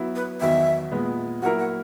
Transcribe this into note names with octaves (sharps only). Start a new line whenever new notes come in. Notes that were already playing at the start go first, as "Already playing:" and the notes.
Already playing: F#3 B3 E4
B4
E2 D#3 F#3 E5
A#2 G#3 B3
F#3 A#3 E4 A#4 F#5
F#5